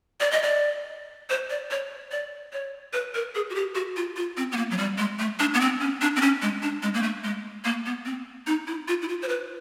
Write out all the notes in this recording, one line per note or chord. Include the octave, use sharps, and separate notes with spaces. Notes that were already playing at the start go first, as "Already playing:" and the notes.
D5
D#5
D5
C5
D5
C#5
D5
C#5
B4
A#4
G#4
F#4
G4
F#4
F4
F4
C4
B3
A#3
F#3
G3
G#3
A3
D4
B3
C4
C#4
D4
C4
C#4
G#3
D4
G#3
A#3
A3
G#3
A#3
B3
C4
D#4
E4
F4
E4
F4
C5
B4